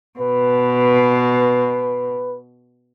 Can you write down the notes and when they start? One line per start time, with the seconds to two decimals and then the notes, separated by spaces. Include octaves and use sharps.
0.19 B2 B4